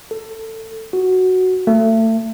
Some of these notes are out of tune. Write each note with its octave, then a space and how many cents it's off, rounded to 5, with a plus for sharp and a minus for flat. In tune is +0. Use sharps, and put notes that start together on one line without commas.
A4 +20
F#4 +0
A3 +30